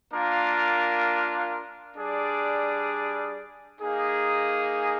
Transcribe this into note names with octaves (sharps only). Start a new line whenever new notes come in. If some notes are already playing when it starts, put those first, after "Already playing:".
A#3 D4 F4 A#4
G3 D4 G#4 D5
A#3 D#4 G#4